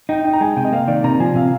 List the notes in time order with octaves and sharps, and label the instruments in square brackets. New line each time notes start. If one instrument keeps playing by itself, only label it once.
[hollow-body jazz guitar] D#4 [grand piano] G5
[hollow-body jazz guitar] D#4 [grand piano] G5
[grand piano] A#5
[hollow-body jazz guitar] G#3 [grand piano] G#5
[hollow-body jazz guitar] C3 [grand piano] G5
[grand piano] D#5
[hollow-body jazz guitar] A#3 [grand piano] F5
[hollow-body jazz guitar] D#3 [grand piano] D5
[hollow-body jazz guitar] C3 [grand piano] A#5
[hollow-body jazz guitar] F3 [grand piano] G#5
[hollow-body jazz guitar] C3 [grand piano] F5